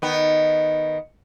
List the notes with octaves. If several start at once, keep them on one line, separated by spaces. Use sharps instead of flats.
D#3 B3